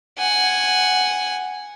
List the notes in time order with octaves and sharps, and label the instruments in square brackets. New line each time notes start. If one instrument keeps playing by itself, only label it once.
[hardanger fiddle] F#5 G#5